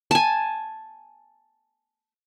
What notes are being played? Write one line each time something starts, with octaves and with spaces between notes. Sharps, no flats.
G#5 A5